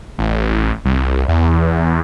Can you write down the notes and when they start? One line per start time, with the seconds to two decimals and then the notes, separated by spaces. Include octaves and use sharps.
0.19 A1
0.85 C2
1.28 E2